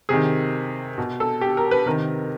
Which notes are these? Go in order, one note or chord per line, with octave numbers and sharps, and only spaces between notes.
C3 D#3 G#4
B2
A4
G4
A#4
B4
C3 D#3 A#4